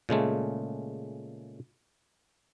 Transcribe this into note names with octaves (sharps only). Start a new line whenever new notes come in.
A#2 C#3 G#3 A3